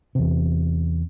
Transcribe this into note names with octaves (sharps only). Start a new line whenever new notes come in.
E2 C3